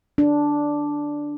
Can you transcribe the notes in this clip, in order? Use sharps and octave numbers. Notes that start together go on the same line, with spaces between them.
D4